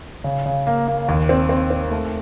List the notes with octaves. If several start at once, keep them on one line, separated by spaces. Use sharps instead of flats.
C#3
C#3
A#3
A#3
D#2
C4
C4
C4
A3